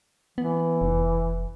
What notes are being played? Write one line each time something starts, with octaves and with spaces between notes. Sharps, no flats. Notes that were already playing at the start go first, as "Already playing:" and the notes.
E3 B3
F1